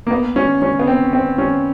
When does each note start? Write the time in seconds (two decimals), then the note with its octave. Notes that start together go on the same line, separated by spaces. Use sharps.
0.07 A#3
0.11 B3
0.36 C#4
0.62 C#4
0.79 B3
0.87 C4
1.13 C4
1.38 C#4